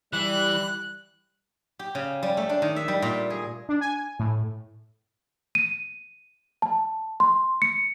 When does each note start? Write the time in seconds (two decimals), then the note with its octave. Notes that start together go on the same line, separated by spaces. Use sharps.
0.13 E3 G3 F#6
1.79 G4
1.95 C#3
2.23 G3
2.37 A3
2.49 D4
2.62 D#3
2.76 E5
2.88 G3
3.02 A#2
3.30 G#4
3.69 D4
3.81 G#5
4.19 A2
5.55 D#7
6.62 A5
7.20 C6
7.62 C#7